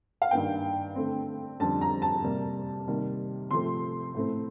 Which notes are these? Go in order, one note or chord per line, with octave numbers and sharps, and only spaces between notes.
F5
G2 D#3 A#3 G5
D3 A3 C4
F2 D3 G3 C4 A5
A#5
A5
C3 G3 A#3
C3 D#3 G3 A#3
C3 F3 A3 C4 C6
A2 A3 C4